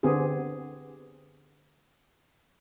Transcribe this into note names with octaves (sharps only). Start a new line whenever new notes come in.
D3 B3 C4 G4 G#4